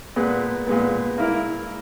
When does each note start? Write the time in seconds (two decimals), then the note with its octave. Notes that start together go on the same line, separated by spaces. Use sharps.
0.16 A#2 G#3 B3
0.67 A#2 G#3 B3
1.18 A#3 E4 A#4